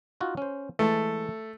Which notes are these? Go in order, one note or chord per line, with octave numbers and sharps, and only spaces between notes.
D#4 F4 F#4
C#4 C5
E3 G#3 A3 A5